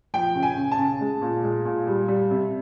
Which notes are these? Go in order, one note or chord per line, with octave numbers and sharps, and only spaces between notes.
F3 G5
C#3
G#5
C#3
A5
C#3
G#3
A#2
G#3
A#2
G3
G3
C3